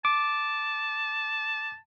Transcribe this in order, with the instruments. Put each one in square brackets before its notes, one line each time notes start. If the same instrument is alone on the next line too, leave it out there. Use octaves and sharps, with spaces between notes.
[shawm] A5 [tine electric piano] D6